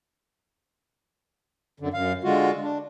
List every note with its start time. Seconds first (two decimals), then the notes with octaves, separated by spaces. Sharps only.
1.80 F#2 D3
1.94 F#2 F5
2.24 D3 G#3 F4 F#4
2.63 D4